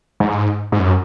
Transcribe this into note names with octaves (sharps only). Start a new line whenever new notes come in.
G#2
G#2
F#2